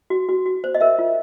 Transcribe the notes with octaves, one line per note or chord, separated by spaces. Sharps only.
F#4
F#4
F#4
C5
D#5
A#4 E5
F4